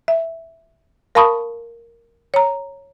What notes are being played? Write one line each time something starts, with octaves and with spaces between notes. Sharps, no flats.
E5
A#4 F5 A5 B5 C#6 D#6
C#5 A#5